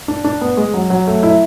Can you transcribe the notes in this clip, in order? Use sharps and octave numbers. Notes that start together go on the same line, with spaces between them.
D4
D4
B3
G#3
F#3
F#3
A3
E4